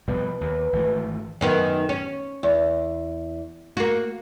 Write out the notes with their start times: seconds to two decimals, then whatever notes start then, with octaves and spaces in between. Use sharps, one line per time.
0.08 B2 F3 G3 B4
0.41 D#2
0.73 G#1 E3 A3
1.41 F#2 D#3 B3
1.89 C#4
2.43 E2
3.77 A#3 F#4